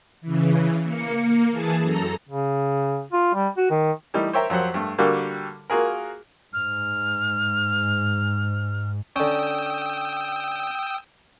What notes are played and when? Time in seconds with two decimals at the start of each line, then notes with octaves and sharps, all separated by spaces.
0.21 C#3 E3
0.83 A#3 C#7
1.22 A#3
1.51 E3 G#4 A5
1.81 F#2 A4 A#5
2.29 C#3
3.12 F4
3.34 G3
3.57 F#4
3.70 D#3
4.14 E3 G3 A3 D#4
4.33 C5 C#5 E5 G5 A#5
4.50 F2 F#3 G4 C5 F#5
4.74 G2 A3
4.98 D3 G3 A#3 F#4 G4 A4
5.70 A#3 F4 F#4 G#4 A#4
6.53 G#2 F6
9.16 D3 C#4 G5 D#6 E6